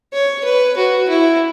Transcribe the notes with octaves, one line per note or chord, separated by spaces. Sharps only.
C#5
B4
F#4
E4